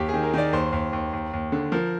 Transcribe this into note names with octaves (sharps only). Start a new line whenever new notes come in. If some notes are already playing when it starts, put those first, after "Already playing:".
Already playing: D#2 G4
G#4
D#3
A#4
D#3 D5
D#2 C5
D#2
D#2
D#2
D#2
D3
F3 A#4